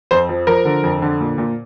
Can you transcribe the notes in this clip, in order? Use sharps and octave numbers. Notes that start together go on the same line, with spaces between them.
F2 C5
F3
F3 A#4
D3
F2
D3
A#2
A#2